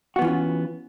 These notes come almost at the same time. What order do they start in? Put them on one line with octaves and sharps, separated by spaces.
F#4 B3 E3 F4 C#4